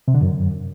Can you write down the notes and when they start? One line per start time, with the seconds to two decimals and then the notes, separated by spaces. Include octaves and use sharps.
0.08 C3
0.14 D3
0.21 F#2